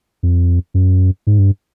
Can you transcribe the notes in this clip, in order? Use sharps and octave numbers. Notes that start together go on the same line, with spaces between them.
F2
F#2
G#2
G2